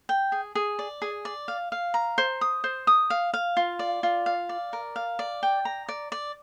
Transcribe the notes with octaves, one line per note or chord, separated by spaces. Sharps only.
G5
G#4
G#4
D5
G#4
D5
F5
F5
A#5
C5
D#6
C5
D#6
F5
F5
F4
D5
F4
F5
D5
A#4
F5
D5
G5
A#5
D5
D5